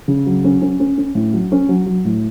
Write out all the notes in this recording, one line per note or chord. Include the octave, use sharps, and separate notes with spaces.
C#3
F#3
C#4
C#4
C#4
C#4
A2
F#3
C#4
F#3
F#3
A2